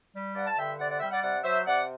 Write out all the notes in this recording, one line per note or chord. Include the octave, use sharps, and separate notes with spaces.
G3
G2 D5 F#5
A5
D3 E5 G5
C3 D5 F#5
D5 F#5
G3 E5 G5
D5 F#5
C3 D5 F#5
F#3 C5 E5
C3 D5 F#5